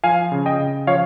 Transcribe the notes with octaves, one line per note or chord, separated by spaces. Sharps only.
F3 F5 G#5
C#3
D#5 G5
C#3
F3 C#5 F5